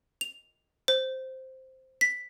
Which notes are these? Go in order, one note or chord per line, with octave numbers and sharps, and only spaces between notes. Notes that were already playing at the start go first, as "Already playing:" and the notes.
F7
C5
B6